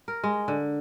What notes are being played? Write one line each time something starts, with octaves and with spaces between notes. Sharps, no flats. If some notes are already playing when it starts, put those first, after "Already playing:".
A#4
G#3
D3